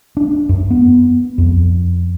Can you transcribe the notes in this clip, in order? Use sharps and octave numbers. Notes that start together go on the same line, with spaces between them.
D4
F#2
B3
F2